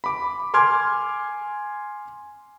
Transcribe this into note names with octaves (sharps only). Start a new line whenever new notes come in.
B5 D6
G#5 C6 D6 F6 G#6